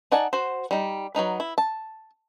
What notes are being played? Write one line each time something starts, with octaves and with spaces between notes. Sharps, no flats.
D#4 D5 F#5 G#5 A5
F#4 C5
G3 D#4
F#3 A#3 D#4 B4
E4
A5